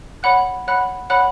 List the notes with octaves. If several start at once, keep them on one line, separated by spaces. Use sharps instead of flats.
C#5 F#5 B5 F#6
C#5 F#5 B5 F#6
C#5 F#5 B5 F#6